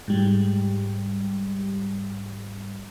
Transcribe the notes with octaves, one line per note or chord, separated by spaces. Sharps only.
G#2 G3